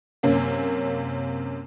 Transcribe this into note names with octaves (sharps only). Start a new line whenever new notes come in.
F#2 C3 A#3 C#4